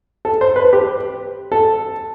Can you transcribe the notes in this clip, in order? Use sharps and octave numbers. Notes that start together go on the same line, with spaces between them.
A4
C5
B4
G4
A4